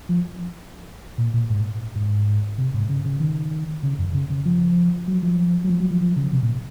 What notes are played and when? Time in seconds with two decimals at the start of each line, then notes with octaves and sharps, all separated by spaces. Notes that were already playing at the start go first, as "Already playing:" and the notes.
0.09 F3
1.18 A#2
1.33 A#2
1.50 G#2
1.95 G#2
2.58 C3
2.74 G#2
2.89 C#3
3.05 C#3
3.20 D#3
3.83 C#3
3.99 F#2
4.14 C#3
4.30 C#3
4.45 F3
5.08 F#3
5.22 F3
5.64 F#3
5.70 F3
5.80 F#3
5.91 F3
6.01 F3
6.16 C#3
6.32 C3
6.43 A#2